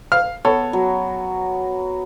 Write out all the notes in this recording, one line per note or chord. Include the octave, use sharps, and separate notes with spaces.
F5 F6
B3 A4 C#5
F#3